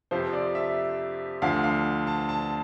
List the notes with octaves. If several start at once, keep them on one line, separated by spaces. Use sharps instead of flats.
F2 C3 F3 C5
D5
E5
D2 D3 F3 F5
F5
A5
A5